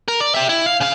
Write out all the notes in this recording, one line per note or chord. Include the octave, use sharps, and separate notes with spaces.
A#4
D5
G4 E5
E4
F5
C#3 F5